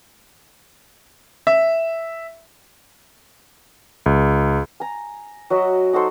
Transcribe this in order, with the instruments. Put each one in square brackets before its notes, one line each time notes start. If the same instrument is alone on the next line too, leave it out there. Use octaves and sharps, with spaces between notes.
[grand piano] E5
[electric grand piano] C#2
[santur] G#5 A#5
F#3 F#4 D#5 E5
D#4 F#4 A4 C5